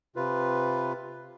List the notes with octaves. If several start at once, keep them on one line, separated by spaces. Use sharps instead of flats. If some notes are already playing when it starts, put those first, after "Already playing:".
C3 F4 B4